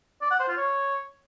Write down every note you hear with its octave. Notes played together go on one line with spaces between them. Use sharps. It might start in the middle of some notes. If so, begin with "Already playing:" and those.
D5
F#5
C5
F4
C#5